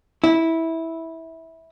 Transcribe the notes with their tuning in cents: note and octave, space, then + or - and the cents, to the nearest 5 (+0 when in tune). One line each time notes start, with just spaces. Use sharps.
E4 -15